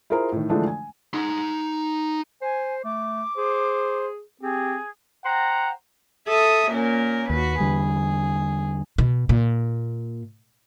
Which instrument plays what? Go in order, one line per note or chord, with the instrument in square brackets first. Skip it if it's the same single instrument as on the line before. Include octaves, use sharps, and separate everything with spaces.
[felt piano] E4 F4 G#4 A#4 C5 A#5
A2 D#3
D3 E3 F3 G#3 A3 D4
G#5
[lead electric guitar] D#4 C6
[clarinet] C5 [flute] G#5
[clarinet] A3 [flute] D6
[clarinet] G#4 [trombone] C5
[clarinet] C4 [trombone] G4 [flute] G#4
[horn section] C5 F#5 G5 A#5
[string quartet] A4 E5 D#6
A#2 C#4 A#4
[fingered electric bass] D#2 [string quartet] F#4 B4
[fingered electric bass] E2 D3 G3 [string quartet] G#4
[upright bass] B2
A#2